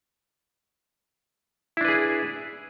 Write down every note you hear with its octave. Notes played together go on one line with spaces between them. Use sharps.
D4 E4 G#4 B4